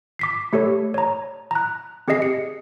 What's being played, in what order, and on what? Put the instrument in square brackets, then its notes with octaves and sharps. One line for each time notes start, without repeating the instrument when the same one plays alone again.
[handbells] D6 B6 C7
A3 G4 A4 C#5
C#5 A#5
A#5 F#6
C4 G4 G#4 D#5 C7
C#7